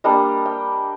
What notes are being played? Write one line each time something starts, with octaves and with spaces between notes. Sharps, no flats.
G3 A#3 D4 D#5
G5